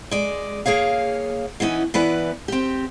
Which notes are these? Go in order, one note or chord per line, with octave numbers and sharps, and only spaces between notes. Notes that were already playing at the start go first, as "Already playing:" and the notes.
G#3 D5
A#3 G#4 C#5 F5
E3 B3 C#4 D#4
E3 B3 B4 D5
C4 G4